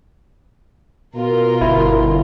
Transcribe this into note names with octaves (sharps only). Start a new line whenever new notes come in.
B2 F4 A#4
G1 E4